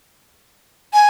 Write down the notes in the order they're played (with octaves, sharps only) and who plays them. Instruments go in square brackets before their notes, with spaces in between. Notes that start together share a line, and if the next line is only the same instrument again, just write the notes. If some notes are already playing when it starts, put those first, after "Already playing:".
[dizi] G#5